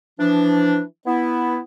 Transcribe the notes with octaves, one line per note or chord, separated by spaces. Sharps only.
E3 F3 D4
B3 E4